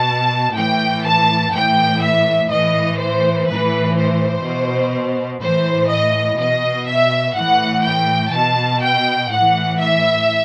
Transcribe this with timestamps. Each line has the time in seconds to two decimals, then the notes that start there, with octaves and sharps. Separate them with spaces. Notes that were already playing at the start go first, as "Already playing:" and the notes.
Already playing: B2 A5
0.55 A2 E3 G5
1.05 A5
1.53 A2 E3 G5
2.01 E5
2.50 A2 E3 D#5
2.99 C5
3.48 A2 E3 B4
3.96 C5
4.45 B2
5.42 A2 E3 C5
5.91 D#5
6.40 B2 D#5
6.88 E5
7.37 A2 E3 F#5
7.85 G5
8.34 B2 A5
8.83 G5
9.32 A2 E3 F#5
9.80 E5